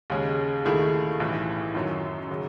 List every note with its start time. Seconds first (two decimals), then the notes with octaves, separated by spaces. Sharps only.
0.10 D#2 C#3 G#3 C#4 G#4
0.65 D#2 D#3 A3 E4 G#4
1.20 B1 A2 E3
1.75 F#2 D#3 F#3 C#4
2.31 C#3 F#3